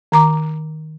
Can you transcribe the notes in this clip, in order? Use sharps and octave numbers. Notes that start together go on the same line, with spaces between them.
D#3 A#5 D6